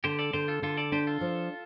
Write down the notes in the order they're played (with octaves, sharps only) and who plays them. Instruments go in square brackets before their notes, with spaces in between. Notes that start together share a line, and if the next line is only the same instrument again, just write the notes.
[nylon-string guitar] D3 [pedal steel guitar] G4 C5
[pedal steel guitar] A4 D5
[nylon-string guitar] D3 [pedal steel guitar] G4 C5
[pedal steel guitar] F4 A4
[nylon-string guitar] D3 [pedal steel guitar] F4 A4
[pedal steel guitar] A4 D5
[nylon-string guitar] D4 [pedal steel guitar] G4 C5
[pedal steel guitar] F4 A4
[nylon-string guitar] F3